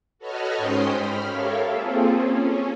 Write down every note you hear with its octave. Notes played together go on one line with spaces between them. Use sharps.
F#4 A4 B4 C#5 D#5 F6
G#2 C#4 C5 G5 C6 D#6
B5 F6
G4 A4 A#4 C#5 E5 F5
A#3 C4 F4 G#4 A4
C#4